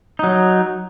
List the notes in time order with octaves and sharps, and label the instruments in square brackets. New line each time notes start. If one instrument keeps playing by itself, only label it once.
[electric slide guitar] F#3 D#4